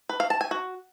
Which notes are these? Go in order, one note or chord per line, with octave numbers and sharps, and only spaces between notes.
B4
F5
A5
G#5
F#4